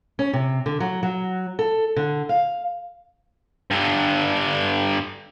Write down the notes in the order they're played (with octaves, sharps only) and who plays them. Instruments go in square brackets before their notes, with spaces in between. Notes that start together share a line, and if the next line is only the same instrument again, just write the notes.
[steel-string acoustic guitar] C#4
C3
D3
F#3
F#3
A4
D3
F5
[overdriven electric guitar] G2 D3